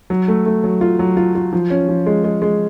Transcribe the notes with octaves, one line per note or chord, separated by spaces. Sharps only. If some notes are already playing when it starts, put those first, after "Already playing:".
F#3
A3
A3
F#3
F4
F#3
F4
F4
F3
C#4
F3
G#3
G#3
G#3